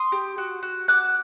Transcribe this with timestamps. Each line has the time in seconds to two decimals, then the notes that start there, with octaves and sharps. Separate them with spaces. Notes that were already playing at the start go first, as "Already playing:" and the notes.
Already playing: C6 D#6
0.12 G4
0.38 F#4
0.63 F#4
0.88 F#4 D6 F#6